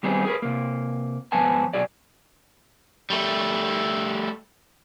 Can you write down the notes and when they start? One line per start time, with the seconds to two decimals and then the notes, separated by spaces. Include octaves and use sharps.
0.03 D#3 G3 B3 C4 D#4 G#4
0.25 G#4 A#4 B4
0.42 C3 A#3
1.32 G#2 F3 B3 B4 G#5 A5
1.74 B2 F#3 G#4 D5
3.10 G3 A3